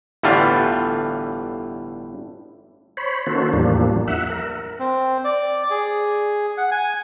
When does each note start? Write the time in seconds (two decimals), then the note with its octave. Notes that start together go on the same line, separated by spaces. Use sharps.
0.23 G1 A2 D3 E3 G3 F4
2.97 C5 C#5 B5
3.27 D#3 A#3 C#4 F#4 A4 C5
3.53 E2 A2 F3 G3 A#3 D4
4.08 E5 F#5
4.30 A#4
4.80 C4
5.24 D5
5.70 G#4
6.58 F#5
6.72 G#5